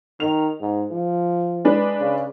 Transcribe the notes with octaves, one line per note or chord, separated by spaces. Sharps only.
D#3 F7
G#2
F3
G#3 D4 B4
C#3